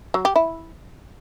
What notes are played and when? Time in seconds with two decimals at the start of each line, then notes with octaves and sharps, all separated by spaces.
0.14 F#3
0.25 G4
0.36 E4